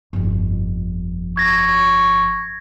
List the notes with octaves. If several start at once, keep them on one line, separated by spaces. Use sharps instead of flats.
G1 F2
C#6 G#6 A#6